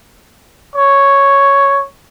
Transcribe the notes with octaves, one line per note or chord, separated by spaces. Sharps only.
C#5